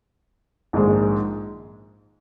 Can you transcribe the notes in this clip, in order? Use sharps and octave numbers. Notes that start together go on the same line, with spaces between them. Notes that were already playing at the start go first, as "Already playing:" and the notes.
A#1 G#2 D#3 G#3